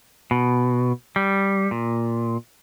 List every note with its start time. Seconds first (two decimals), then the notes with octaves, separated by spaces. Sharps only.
0.31 B2
1.16 G3
1.71 A#2